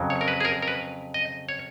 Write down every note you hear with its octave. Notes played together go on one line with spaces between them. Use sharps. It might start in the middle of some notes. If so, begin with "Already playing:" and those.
Already playing: F2 C#3 F#3
C#5
A#4
B4
G#4
A#4
A#4
B4
D#5
C#5